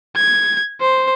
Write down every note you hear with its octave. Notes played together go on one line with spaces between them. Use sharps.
G#6
C5